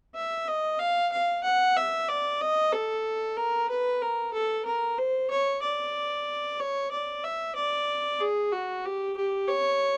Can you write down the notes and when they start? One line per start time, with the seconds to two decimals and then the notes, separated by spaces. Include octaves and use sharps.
0.15 E5
0.48 D#5
0.79 F5
1.12 F5
1.43 F#5
1.76 E5
2.08 D5
2.41 D#5
2.72 A4
3.37 A#4
3.70 B4
4.02 A#4
4.33 A4
4.65 A#4
4.98 C5
5.30 C#5
5.62 D5
6.60 C#5
6.91 D5
7.24 E5
7.56 D5
8.20 G#4
8.52 F#4
8.85 G4
9.17 G4
9.48 C#5